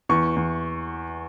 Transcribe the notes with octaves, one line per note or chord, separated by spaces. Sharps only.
E2 C#6
E2